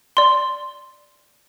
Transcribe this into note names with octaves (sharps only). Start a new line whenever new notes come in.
D5 C6